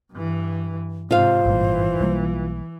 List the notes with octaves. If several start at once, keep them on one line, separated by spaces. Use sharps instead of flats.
G2 E3
G#2 C3 F4 C5 F5
G#1 G2 A#2 E3
B1 G3 A#3